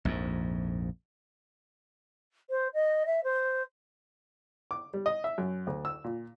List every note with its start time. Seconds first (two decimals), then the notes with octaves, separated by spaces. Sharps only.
0.05 A#1 F2 G#2
2.50 C5
2.74 D#5
3.06 E5
3.24 C5
4.71 D6
4.94 G3
5.06 D#5
5.24 E5
5.38 F#2
5.67 D2
5.85 E6
6.04 A#2